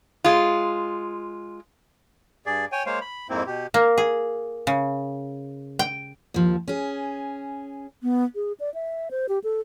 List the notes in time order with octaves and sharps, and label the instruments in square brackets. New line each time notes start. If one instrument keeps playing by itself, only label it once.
[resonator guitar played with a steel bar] G#3 F4
[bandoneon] G2 G#4 D5
C#5 G5 G#5
G#3 A#3 C5 C#5 F5
B5
F2 G#2 A#3 C4 E4
B2 G4
[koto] A#3
G#4
C#3
G5
[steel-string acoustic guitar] D#2 F3
C#4 G#4
[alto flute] B3
G#4
D5
E5
C5
G4
A4